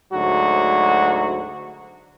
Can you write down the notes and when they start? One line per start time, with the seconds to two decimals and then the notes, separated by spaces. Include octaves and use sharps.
0.13 D2 G#2 F#3 F#4